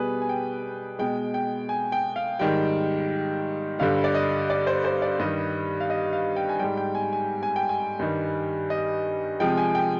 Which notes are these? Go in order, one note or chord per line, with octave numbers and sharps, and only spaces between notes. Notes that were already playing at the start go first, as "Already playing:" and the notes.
Already playing: B2 G3 G#4 B4
G#5
G5
B2 G#3 G5
G5
G#5
G5
F5
G#2 D#3 G3 G5
G2 D3 G3 F5
D5
D#5
D5
C5
C5
D5
G2 D#3 G3 D#5
F5
D#5
F5
G5
G#5
G#2 G3 G5
G5
G#5
G#5
G#5
G5
G#5
G2 D#3 G3
D#5
C3 F3 G#3 G5
G#5
G5